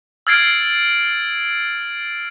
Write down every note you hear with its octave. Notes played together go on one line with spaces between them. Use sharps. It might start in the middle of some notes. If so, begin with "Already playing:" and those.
E6 F6 G#6 A6 C7 D7